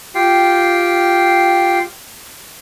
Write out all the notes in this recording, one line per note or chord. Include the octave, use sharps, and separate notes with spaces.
F4 G4 F5 G5